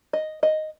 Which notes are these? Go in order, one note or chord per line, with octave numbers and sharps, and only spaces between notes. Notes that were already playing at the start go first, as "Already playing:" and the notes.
D#5
D#5